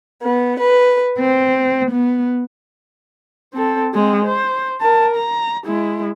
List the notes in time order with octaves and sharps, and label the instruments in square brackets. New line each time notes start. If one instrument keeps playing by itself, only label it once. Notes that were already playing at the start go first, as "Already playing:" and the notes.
[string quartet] B3
B4
C4
B3
[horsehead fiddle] C4 A4
G#3 C4
C5
A#4 A5
A#5
G#3 E4